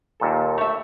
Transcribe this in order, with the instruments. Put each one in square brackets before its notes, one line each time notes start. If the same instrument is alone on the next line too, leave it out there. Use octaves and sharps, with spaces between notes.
[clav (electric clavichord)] D#2 A#2 A4
[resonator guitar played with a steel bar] A3 E5